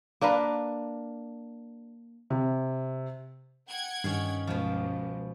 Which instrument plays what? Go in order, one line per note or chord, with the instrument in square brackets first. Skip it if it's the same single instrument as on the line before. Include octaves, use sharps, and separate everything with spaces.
[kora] A#3 D4 A#4 B4
[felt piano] C3
[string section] F#5 G5 G#6
[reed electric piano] G2 [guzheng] D#3 C#4
[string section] C#2 [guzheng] B2 F3